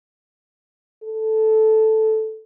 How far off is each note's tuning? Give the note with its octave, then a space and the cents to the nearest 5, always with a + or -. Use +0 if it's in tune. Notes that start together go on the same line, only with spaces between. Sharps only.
A4 -5